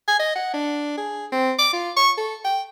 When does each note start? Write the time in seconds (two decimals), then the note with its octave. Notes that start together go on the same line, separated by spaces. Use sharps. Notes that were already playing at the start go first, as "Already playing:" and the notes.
0.08 G#5
0.19 D#5
0.36 F#5
0.53 D4
0.98 G#4
1.32 C4
1.59 D6
1.73 F4
1.97 C#6
2.18 A4
2.44 G5